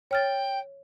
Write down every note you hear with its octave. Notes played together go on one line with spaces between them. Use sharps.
C#5 G5 F6 A6